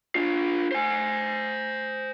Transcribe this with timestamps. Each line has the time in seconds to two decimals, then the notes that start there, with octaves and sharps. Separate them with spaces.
0.15 D4 F4
0.72 C5 G#5